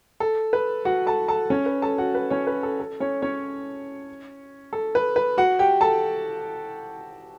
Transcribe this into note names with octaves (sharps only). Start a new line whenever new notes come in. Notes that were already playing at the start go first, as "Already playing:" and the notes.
A4
B4
F#4 F#5
A4 A5
A4 A5
C#4 C#5
B4
A4 A5
F#4 F#5
B4
C#4 C#5
B4
A4
A4
C#4 C#5
C#4 C#5
A4
B4
B4
F#4 F#5
G4 G5
A4 A5